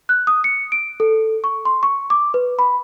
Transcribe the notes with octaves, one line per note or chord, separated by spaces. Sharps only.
F#6
D#6
C#7
D7
A4
C#6
C6
C#6
D6
B4
B5